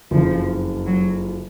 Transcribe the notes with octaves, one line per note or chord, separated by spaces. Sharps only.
F#1 F2 C#3 F3
F#3